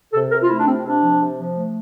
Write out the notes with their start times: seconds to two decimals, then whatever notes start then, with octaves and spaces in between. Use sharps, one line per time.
0.13 C3 A4
0.31 C3 A#4
0.42 F4
0.49 A3 E4
0.59 D4
0.66 C3 C4
0.84 C3 D4
1.02 F3
1.19 C3
1.37 F3
1.55 A3